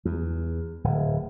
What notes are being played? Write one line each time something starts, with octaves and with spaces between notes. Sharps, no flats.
E2
D1